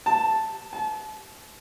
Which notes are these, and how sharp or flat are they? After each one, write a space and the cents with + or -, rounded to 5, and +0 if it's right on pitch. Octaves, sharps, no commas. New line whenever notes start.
A5 +0
A5 -35